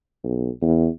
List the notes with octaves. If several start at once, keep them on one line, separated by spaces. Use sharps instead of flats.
B1
E2